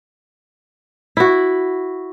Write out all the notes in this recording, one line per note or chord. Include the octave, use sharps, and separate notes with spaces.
E4 F#4